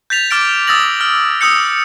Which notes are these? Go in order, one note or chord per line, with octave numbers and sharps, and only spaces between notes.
G6 A6 B6 F7
D6 F6 A6 D7
F6
D#6 E6 A6 A#6 F#7
F6
D#6 E6 G6 C#7